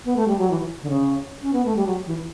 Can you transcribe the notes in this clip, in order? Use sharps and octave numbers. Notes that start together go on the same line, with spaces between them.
B3
A3
G3
F#3
E3
D3
C#3
C#4
B3
A3
G3
F#3
E3